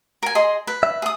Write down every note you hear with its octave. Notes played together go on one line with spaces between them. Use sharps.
A#4 G#5
G#4 D#5 C6
B4
E5
G#4 D#6